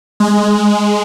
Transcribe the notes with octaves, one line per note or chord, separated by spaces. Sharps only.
G#3